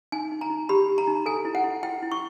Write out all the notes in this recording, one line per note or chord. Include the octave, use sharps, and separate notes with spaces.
D#4 G#5
D#4
A#5
D#4
G4 B5
G4
A#5
D#4
A4 G#5
E4
F#5
E4
E4 G5
E4
C#6